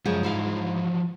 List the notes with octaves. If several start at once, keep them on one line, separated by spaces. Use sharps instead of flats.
F#2 C#3 F3 G#3
G#2 F3 F#3 E4 F5